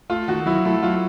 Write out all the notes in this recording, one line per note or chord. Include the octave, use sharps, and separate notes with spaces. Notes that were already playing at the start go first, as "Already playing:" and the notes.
A3 F4
D#3 F#4
F#3 E4
A3 E4
F#3 F4